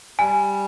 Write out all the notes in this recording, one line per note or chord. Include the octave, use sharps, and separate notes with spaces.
G3 G#5